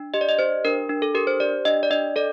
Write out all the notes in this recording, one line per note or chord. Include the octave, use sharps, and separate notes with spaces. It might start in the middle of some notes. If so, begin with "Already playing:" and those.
Already playing: D4
G4 D#5
D5
D#5
G4 C5
D4 A#4
D4
A4
G4 A#4
C5
G4 D5
D4 D#5
D5
D4 D#5
A4 D5